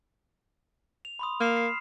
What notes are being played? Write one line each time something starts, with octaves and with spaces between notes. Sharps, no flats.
F7
B5 C6 D#6
A#3 F6 C7 E7
C7